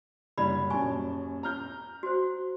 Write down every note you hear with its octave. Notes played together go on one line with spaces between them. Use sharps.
F#1 G3 E4 B5 G#6
D#1 F#2 G#5 A5 C#6
A#5 F6 G6
F#4 C5